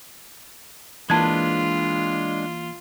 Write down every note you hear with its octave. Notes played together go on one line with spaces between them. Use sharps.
E3 G#3 A#3 D4 F4 B4 A5 G#6